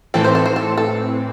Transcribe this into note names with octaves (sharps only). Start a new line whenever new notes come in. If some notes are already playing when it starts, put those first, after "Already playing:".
A2 E3 C4 A4
C5
A4
C5
A4
A4